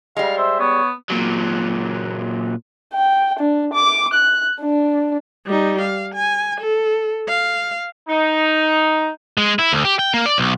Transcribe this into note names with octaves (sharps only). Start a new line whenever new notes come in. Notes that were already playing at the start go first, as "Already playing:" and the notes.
G3 G#3 F5
C5 E5
B3 C#5
A#2 F#3
G5
D4
D6
F#6
D4
G3 D#4
F5
G#5
A4
F5
D#4
G#3
E4
D2
G4
G5
A#3
D5
B1